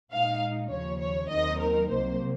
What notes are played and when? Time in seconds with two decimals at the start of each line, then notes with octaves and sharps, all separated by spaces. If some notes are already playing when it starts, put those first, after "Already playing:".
0.12 A#2 G#3 D#4 F5
0.71 D#2 C#3 F3 C#5
1.01 C#5
1.30 D#2 D#3 F#3 C4 D#4 D#5
1.60 A#4
1.89 C2 C3 F#3 A#3 C5